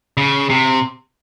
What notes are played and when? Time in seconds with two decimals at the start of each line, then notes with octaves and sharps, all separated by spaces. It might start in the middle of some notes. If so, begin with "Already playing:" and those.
0.17 C#3
0.50 C3